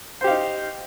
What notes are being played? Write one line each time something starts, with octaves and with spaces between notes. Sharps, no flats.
D#4 G4 C5 F5